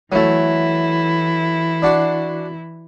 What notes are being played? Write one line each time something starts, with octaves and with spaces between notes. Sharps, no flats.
E3 F#3 A3 E4
D4 F#4 C6